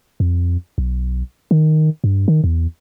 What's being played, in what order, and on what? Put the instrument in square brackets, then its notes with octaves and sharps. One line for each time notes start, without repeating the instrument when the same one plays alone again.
[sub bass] F2
B1
D#3
G2
D#3
E2